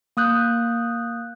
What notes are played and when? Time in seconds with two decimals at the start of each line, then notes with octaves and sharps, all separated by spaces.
0.17 A#3 D#6 F#6 G6